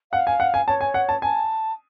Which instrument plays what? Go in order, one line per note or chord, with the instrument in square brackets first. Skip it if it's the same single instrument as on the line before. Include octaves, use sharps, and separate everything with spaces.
[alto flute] F5 [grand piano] F#5
[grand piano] G#5
F#5
G#5
[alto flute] C#5 [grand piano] A5
[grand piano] G#5
F#5
A5
[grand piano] G#5 [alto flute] A5